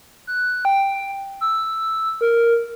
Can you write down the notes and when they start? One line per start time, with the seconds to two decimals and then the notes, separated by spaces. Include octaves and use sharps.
0.27 F#6
0.65 G5
1.41 E6
2.21 A#4